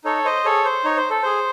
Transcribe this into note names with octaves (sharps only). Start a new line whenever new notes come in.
D#4 A4 C#5
C5 D#5
G#4 A4 C#5
C5
D#4 C#5
C5
A4
G#4 C5